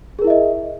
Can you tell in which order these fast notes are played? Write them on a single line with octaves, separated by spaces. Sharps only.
G#4 A#4 E4 E5 D#5